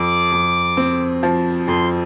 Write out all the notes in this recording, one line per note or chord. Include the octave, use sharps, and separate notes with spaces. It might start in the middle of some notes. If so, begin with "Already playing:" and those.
Already playing: F2 D6
F2
C4
F3
F2 C6